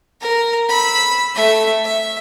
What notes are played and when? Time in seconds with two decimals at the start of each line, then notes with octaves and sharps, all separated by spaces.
0.21 A#4
0.69 B5 E6
1.35 A3 E5
1.85 E5